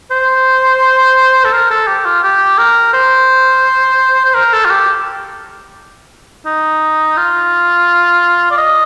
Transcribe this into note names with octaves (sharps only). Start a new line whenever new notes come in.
C5
A4
A#4
A4
G4
F4
G4
A#4
C5
C5
A#4
A4
F4
G4
D#4
F4
D5
D#5